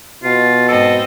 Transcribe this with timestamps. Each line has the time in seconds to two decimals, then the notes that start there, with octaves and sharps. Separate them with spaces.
0.24 B2 F4
0.69 G#2 C4 A4 D#5